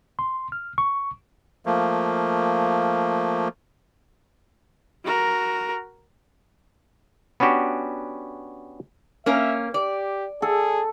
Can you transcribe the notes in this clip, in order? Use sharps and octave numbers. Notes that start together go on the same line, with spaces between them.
C6
F6
C#6
F3 A3 A#3
F#4 A#4
B3 C#4 D4 F#4 G4
A#3 C#4 A#4 E5
G4 D5
G#4 A4